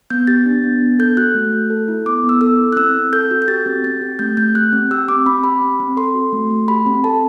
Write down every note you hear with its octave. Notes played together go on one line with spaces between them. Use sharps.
B3 G6
G4 A6
D4
B3
B3
A4 G6
F#4 F#6
A3
A3
A4
E4
B3 D6
B3
E6
A4 E6
E4
F#6
C4 E6
C4
A4 G6
F#4
G6
G4 A6
C4
C4 A6
G4
A3 G6
A3 G6
G4 F#6
C4
G4 E6
C4 D6
C4 B5
G4 B5
C4
C4
A4 C6
F#4
A3
A3
G4 B5
C4
A4 A5